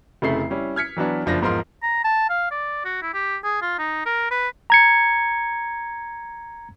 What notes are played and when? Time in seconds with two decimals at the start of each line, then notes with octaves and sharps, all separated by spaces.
0.22 F1 C#3 A3 E4 C7
0.50 G3 C#4 E4
0.76 F6 G#6 B6 C#7
0.96 E3 F#3 B3 D4
1.26 F#1 F3 D4 A#6
1.41 E2 G#2 F3 A#4 C6
1.83 A#5
2.05 A5
2.30 F5
2.51 D5
2.85 F#4
3.02 E4
3.14 G4
3.44 G#4
3.62 F4
3.79 D#4
4.06 A#4
4.31 B4
4.70 A#5 G#6 C#7